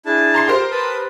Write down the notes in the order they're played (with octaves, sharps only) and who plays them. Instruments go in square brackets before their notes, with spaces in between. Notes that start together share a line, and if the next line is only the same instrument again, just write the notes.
[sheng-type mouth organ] D4 E4 A5 [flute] G#4
[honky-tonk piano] A#5 C6 C7
G4 A#4 C5
[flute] B4 [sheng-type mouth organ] A5 B5 D#6